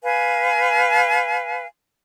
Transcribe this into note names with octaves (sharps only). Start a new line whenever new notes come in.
B4 F5 G#5